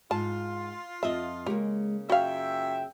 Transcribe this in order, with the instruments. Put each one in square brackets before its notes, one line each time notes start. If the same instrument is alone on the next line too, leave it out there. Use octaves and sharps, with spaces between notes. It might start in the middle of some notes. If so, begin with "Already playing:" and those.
[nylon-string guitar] G#2 [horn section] F4 [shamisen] A5
[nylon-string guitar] F2 D#5 [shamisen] E5
[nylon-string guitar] C#3 A#3 [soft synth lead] G#3 [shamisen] G4
[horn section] F#2 F4 E5 [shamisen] F#4 F5 [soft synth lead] G5